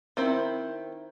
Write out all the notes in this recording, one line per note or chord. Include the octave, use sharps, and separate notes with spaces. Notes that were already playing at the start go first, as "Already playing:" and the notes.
D#3 C4 E4